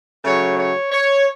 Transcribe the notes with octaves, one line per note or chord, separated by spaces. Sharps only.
C#3 F#3 A3 C#5
C#5
C#5